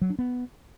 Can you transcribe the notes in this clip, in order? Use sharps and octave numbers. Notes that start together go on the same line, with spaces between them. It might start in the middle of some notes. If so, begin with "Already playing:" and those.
F#3
D4
B3